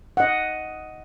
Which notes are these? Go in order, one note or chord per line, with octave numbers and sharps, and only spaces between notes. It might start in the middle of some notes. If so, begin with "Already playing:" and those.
D#5 F#5